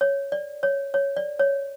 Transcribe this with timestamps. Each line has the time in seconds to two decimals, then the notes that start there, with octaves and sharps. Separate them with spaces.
0.01 C#5
0.32 D5
0.63 C#5
0.94 C#5
1.16 D5
1.39 C#5